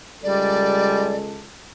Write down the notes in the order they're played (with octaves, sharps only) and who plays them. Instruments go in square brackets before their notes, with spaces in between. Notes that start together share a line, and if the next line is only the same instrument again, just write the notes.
[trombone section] C#2 G#3 A4 [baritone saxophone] G3 [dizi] D5